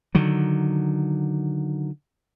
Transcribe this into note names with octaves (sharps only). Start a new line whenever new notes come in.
D3 D#3 F#3